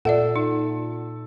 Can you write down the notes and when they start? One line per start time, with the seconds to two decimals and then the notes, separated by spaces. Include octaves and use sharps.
0.05 A#2 A4 D5 E5 F#5
0.36 D#4